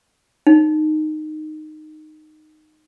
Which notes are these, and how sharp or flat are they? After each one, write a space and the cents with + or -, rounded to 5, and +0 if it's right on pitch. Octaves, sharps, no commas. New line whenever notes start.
D#4 -15